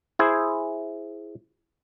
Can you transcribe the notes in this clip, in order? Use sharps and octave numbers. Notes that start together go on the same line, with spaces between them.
E4 G#4 C5